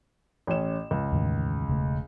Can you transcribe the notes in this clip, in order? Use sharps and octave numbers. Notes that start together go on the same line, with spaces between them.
A1 C#4 E7
C#2
E2 A2 D#3
E1 C#3 A3